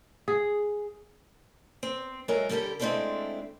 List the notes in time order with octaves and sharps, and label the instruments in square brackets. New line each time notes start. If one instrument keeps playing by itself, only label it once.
[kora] G#4
[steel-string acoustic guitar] C4
F#3 G#3 A4 A#4 E5
D3 G3 G4 A4 A#4
G#3 A3 C4 D4 E4 A4